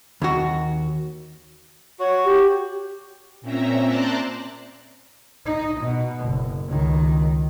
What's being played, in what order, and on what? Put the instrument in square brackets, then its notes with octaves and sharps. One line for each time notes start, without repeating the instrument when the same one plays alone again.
[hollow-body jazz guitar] D#2 F#4
[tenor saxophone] F#4 [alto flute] C#5
[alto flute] G4
[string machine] A#2 C4 C#4 E5 A#5
C5 D5 A5 A#5 F#6
[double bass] D#4
B2
F#1
C#2 D#3